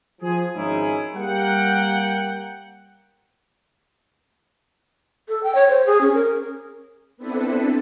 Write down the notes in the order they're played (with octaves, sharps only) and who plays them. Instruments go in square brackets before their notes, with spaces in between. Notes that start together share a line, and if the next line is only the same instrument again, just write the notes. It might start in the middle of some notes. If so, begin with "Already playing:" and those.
[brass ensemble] F3 G#4
G#1 G#2 C#4 D#4 E4 G#4
G3 A#3 F#5 G5
[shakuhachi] A4
G5
C#5
C5
G#4
C#4
A#4
[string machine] B3 C4 D4 E4 A4 B4